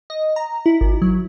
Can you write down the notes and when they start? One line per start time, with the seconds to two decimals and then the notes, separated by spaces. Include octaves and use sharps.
0.10 D#5
0.36 A#5
0.66 E4
0.81 G#1
1.02 F#3